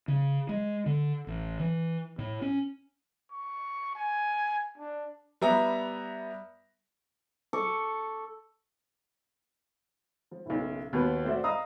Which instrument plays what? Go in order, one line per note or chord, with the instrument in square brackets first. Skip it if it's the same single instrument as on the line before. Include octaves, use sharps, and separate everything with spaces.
[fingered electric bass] C#3
G#3
D3
A1
E3
A2
C#4
[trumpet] C#6
G#5
D4
[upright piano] G3 B3 E5 A#5
[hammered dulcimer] A4 C#6 D6
[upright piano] F3
F#1 B1
D#2 B2 B4
A3 C4 F#4 C5 D5 E5
D#5 F5 A#5 D#6 E6